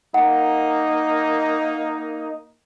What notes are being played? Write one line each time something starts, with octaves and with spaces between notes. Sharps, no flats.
A#3 D#4 F#5